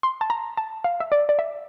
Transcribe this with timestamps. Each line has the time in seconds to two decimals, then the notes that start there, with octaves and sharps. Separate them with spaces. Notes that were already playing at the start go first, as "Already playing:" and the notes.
0.03 C6
0.21 A5
0.30 A#5
0.57 A5
0.84 F5
1.00 E5
1.12 D5
1.29 D5
1.39 E5